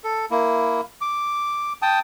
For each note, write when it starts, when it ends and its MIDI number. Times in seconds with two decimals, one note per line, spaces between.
0.04 0.26 69
0.31 0.81 58
0.31 0.81 64
1.01 1.73 86
1.82 1.99 79
1.82 1.99 81
1.82 1.99 87